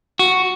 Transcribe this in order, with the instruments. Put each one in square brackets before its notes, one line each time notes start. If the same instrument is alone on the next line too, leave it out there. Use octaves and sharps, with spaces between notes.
[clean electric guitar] F#4